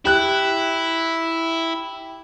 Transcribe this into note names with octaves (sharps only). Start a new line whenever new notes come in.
E4 G4 F#6